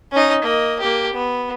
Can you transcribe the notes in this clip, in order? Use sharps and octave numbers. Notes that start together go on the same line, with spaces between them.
C#4 D#4
A#3 D#5
A#3 G4
B3